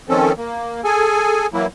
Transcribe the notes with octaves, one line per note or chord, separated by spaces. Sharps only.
D#3 F3 C4 C#4 A4
A#3
G#4 A4 G#5
E3 F#3 A#3 E4